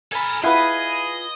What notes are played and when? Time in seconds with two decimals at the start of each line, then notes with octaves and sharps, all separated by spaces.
0.12 A4 A#4 G#5 B5
0.43 E4 F4 G#4 B4 D#5 F#5